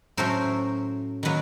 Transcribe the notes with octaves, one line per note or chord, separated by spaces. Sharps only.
A2 F#3 A3 C#4 A#4 C5
D#3 F#3 A#3 B4